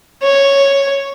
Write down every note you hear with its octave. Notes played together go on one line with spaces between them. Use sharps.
C#5